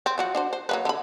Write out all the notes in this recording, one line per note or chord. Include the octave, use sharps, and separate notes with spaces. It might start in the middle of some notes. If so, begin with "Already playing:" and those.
C4
F3 F#3 F#4
D4 F#4 C5
C5
F#3 A#3 B4
D3 B5